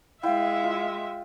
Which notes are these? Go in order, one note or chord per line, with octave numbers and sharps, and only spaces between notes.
G#3 E4 E5 F5 G5 E6
F4